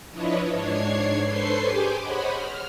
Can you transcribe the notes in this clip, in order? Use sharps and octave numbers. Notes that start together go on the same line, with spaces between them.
F3 D4 E4 B4 C#5 D#5
G#2 D4 C#5 G#6 C7
A4 B4 C5 C6 C#6 C7
G4 G#4 G5 G#5 D6
C5 C#5 D#5 F#5 B5
F6